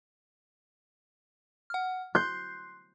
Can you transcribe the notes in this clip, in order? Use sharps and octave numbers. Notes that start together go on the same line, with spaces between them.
F#5 F6
C6 F#6 G6 C7